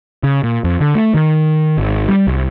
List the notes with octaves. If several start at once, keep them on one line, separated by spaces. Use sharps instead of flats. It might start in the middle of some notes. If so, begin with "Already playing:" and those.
C#3
A#2
F2
D3
A3
D#3
G#1
G3
C2